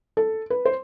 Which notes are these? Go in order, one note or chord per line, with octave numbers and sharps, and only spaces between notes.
A4
B4
C5